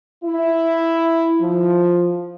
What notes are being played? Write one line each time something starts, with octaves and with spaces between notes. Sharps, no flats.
E4
F3